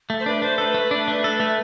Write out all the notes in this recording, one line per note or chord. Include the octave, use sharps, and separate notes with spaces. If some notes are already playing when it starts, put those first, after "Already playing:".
A3
C5
D4 B4
A3 C5
A4 B4
A3
D4
A3
A4
A3